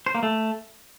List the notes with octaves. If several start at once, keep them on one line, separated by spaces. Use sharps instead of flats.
C5
A#3
A3